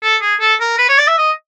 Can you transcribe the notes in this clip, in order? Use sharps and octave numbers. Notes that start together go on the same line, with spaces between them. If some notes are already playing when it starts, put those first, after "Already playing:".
A4
G#4
A4
A#4
B4
C#5
D5
E5
D#5